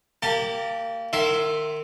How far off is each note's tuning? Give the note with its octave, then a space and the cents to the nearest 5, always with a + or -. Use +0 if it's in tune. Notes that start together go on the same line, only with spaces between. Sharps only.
A#3 -25 G4 -10 A5 +15
D#3 -30 E5 +0 C6 +0